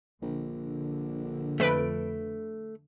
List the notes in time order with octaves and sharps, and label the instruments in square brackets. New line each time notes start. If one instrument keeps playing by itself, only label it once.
[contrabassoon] A#1 [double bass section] D3
[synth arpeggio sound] F2 B4 D7 [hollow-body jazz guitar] A3